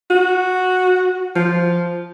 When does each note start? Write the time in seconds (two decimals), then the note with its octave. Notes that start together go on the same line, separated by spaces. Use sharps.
0.11 F#4
1.35 F3